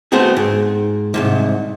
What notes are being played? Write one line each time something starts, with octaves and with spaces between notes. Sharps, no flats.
A3 B3 C4 F#4 G#4
G#2
C2 F2 G#2